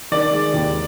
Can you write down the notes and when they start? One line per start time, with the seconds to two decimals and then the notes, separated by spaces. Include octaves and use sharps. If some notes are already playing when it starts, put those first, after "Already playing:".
0.12 D#3 D5
0.32 G#3
0.54 D#2